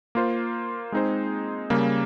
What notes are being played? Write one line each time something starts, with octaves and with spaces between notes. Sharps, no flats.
A#3 F4 C5
G#3 C4 D#4 G#4 C5
C#3 G3 A#3